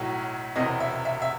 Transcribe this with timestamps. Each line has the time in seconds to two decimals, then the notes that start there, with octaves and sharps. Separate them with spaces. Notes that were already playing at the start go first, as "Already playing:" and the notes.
Already playing: B1 A2 F#3
0.56 E1 E2 C3 D#5
0.80 E5
1.05 E5
1.22 E5